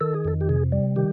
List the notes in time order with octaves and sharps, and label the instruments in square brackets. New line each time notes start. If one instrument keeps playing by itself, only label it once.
[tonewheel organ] D#3 A4
G#4
F2 A4
G4
C3 G#4
G3
D#3 G4